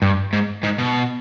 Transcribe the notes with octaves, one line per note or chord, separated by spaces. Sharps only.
G2
G#2
G#2
B2